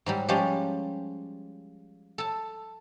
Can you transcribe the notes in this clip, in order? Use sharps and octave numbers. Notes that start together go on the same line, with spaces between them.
G#2 F#3 G3
F3 G3 G#3 C#4 G4
A4 A5